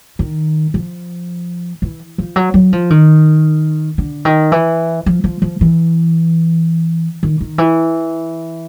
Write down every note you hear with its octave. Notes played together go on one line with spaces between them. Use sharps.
D#3
F3
E3
F3
F#3
F#3
F3
D#3
D3
D#3
E3
F3
F3
F3
E3
D#3
D#3
E3